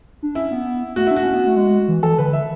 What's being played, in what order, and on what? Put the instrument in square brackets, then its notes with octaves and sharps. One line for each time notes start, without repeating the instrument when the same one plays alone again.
[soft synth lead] D4
[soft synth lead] C#4 [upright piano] E4
[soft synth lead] B3
[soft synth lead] A3 [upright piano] F#4
[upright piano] E4
[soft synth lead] D4
[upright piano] F#4
[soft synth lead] C#4
B3
A3
G#3
E3
[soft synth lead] E3 [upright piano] A4
[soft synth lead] D3 [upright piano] B4
[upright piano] E5